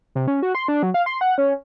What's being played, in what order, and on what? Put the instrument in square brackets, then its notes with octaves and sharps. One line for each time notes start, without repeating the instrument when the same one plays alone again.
[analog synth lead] C3
C#4
F#4
C6
D4
F#3
F5
C6
F#5
C#4